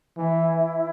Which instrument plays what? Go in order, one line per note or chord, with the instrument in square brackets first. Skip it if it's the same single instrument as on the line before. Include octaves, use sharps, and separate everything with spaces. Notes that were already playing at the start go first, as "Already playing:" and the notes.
[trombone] E3 [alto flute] E4